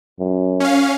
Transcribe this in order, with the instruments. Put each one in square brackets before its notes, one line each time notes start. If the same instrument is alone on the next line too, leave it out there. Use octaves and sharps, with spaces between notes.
[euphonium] F#2
[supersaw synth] C#4 F5